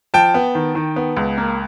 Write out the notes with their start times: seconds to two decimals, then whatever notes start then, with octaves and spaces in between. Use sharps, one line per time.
0.14 F3 G5 A5
0.34 B3
0.55 D#3
0.75 D#3
0.96 B3
1.17 C#2
1.38 A#3